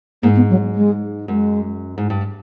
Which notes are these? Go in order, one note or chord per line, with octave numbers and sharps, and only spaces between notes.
G#2 A#3
B3
F#3
G#3
F#2 G#3
G#2
G2